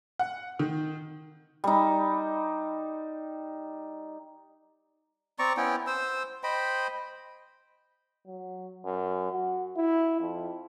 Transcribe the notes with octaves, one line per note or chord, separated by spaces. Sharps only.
F#5
D#3
G3 D#4
C4 D5 A#5 C#6
B3 C#4 E4 G5
C5 E6
C5 D#5 G5 B5
F#3
F#2
F#4
E4
F2